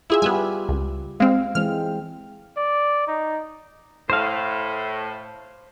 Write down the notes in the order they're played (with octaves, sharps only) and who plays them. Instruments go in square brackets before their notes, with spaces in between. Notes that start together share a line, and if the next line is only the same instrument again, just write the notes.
[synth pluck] E4 G#4 E5 [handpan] F4
[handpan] G3 G4 B4 [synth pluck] B3 E5 G#5
[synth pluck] C#2
[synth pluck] G#3 C4 [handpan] F5
[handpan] E3 G#3 C4 [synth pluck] F6
[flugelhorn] D5
D#4
[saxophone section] A2 [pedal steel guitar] C5 F5